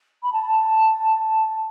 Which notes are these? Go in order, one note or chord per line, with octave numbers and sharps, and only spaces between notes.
B5
A5